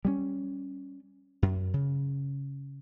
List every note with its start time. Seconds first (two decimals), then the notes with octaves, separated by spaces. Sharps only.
0.05 G3 G#3 C#4
1.42 F#2
1.74 C#3